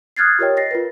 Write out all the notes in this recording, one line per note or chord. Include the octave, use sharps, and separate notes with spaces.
D#6 F6 F#6 G#6 A6 C7
F4 G4 A#4 C#5 D#5 G5
A6 A#6 C7
F4 A#4 B4